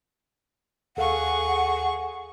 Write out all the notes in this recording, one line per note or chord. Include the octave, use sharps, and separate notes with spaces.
D#2 G#4 A4 F5 F#5 C#6